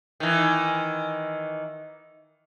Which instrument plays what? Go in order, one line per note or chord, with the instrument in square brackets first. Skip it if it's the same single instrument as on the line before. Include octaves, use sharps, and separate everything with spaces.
[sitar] D#3 E3